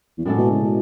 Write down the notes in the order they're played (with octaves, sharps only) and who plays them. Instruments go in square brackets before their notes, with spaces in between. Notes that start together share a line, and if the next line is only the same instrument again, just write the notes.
[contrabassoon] E2
[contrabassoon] F#2 [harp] A2 G#3 D4 F#4 A4
[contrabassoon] B2
C#3
B2